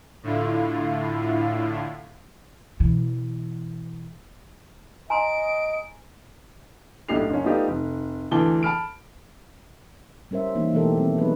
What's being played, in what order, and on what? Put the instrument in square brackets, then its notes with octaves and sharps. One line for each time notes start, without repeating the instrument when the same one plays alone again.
[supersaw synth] A2 D3 E4 F4
[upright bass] B2 E3
[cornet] D#5 [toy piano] G#5 A#5 C6 [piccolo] D7
[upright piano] B1 A2 D4 G4 C7 F7
F#1 C#4
A3 B3 D#4 F4 G4 D5
F1
D2 E3 A5 D6 G7
A5 B5 F6 D7
[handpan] G3 C#4 A#4 C5 E5
E3 A#3 D#4
B2 E3 A3 G4 A4 A#4
D#3 G3 C4
F#3 G3 B3 D#4 G#4 B4